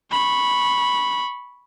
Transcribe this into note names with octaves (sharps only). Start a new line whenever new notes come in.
B5 C#6